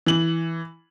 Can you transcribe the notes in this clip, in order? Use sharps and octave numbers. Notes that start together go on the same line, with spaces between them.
E3 F#7